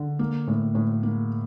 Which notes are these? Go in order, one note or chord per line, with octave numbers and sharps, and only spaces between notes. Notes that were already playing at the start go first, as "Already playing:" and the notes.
Already playing: D3
A#3
A2
A2
A#3